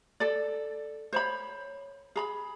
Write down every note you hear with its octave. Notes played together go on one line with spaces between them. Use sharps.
A4 D5
C5 C#5 B5
G#4 A#5 B5